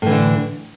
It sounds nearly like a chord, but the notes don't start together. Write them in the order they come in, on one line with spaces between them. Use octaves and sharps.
A2 E3 D3